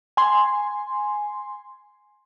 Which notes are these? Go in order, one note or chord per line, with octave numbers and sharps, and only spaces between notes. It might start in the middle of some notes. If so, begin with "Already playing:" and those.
G#5 C6